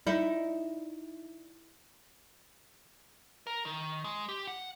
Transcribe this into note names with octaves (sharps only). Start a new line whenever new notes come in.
D#4 E4
A#4
D#3
G#3
G4
F#5